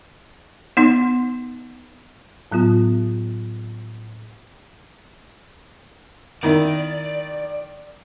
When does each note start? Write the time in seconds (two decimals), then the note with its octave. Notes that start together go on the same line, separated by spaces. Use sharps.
0.77 B3 D#4
2.52 A2 F#3 B3 F4
6.43 D#3 D#4 E4 D5